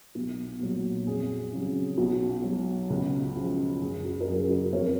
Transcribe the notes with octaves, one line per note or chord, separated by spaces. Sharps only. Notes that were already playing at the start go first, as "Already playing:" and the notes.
B1
A#2 F#3
F2 G#4
C#3 F#3
B1 F#4
B2 F#3
C#2
C#3 F3
F#1 G#4
F#4
A#4
F#2 C#3 F#3 G#4
G#4
F#4 A#4
F2 A#4 C#5